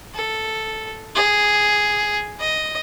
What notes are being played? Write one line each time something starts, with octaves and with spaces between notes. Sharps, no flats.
A4
G#4
D#5